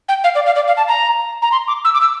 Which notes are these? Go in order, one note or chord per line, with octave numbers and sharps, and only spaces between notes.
G5
F5
D5
F5
D5
F5
A5
A#5
A#5
C6
D6
E6
D6
E6